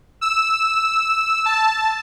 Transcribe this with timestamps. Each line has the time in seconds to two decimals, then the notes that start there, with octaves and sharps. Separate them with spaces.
0.21 E6
1.45 A5